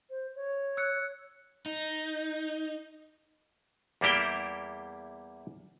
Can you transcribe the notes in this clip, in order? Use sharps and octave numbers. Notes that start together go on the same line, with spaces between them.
C5
C#5
E6 F#6 C#7
D#4
E2 G3 A#3 E4 G4 G5